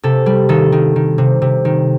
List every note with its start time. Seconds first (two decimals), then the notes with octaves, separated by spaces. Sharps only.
0.03 C3 A4
0.26 G3
0.49 D#3 A4
0.72 D#3
0.96 D#3
1.18 C3
1.42 C3
1.65 D#3